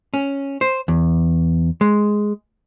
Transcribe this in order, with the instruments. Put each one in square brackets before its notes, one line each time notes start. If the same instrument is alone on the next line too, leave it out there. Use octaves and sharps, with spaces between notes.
[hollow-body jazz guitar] C#4
C5
E2
G#3